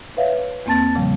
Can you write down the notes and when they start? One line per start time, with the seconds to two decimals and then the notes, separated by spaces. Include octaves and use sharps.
0.17 B4 C#5 E5 F5
0.66 E2 A#3 C4 A5 A6
0.95 A#2 C#3 F3 G3